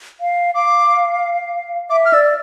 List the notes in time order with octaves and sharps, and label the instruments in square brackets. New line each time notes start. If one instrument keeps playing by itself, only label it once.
[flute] F5
[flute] F5 [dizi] D6
[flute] E5 [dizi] D6
[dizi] F6
[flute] D5 [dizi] E6